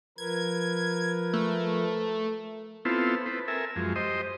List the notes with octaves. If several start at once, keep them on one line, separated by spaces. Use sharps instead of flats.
F3 A#4 B4 G#6
A3
B3 C4 E4 F4 A4
C4 B4
A4 A#4 E5 G#5
F#2 F3 G#3
G4 C5 D#5